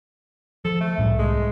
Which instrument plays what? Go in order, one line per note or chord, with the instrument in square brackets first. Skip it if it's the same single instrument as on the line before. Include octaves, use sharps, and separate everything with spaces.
[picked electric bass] F3 [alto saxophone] A4
[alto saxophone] A3
[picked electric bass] C2 A2 G3
[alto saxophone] G#3